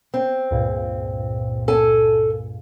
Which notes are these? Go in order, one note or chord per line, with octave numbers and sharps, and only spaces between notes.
C4
C#2 G2 A#2
A4 G#5